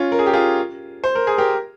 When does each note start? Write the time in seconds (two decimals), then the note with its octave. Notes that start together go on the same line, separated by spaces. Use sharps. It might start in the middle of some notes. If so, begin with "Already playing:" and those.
Already playing: C#4 F4
0.12 A#4
0.19 G#4
0.26 G4
0.33 F4 G#4
1.04 C5
1.15 A#4
1.27 G#4
1.38 G4 A#4